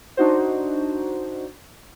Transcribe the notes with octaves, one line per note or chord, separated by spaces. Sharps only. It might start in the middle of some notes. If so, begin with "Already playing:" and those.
D4 D#4 F#4 C5